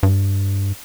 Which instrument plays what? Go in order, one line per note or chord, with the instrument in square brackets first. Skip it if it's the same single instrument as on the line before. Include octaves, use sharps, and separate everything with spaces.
[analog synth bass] G2